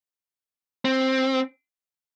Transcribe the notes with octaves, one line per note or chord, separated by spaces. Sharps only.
C4